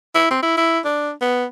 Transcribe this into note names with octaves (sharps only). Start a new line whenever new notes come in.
E4
C4
E4
E4
D4
B3